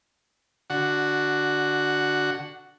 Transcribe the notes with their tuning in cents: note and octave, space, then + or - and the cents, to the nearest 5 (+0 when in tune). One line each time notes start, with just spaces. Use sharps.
D3 +0 F#4 +0